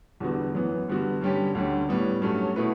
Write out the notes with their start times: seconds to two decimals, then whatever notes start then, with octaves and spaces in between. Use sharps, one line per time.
0.20 E2 D3 G3 B3 F#4
0.54 F#2 E3 B3
0.88 G2 D3 G3 B3 F#4
1.21 G2 D3 G3 C#4 G4
1.55 D2 D3 G3 C#4
1.89 A2 G3 B3
2.22 G2 F#3 A3 C#4
2.56 B2 A3 E4 B4